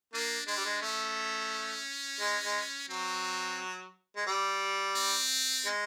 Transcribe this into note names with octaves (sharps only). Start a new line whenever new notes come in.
A#3 D4
G#3 D4
G3
G#3
A3 C#4
G#3
G#3
F#3 C4
G#3
G3
C4
G#3